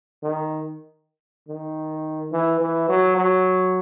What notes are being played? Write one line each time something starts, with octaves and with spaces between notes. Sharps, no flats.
D#3
D#3
E3
E3
F#3
F#3